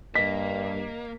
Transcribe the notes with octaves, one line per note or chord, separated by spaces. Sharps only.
G2 A#3 D#5 B6